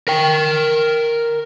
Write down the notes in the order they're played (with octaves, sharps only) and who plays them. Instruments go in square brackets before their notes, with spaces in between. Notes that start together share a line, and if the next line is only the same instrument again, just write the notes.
[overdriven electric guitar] A#4 G5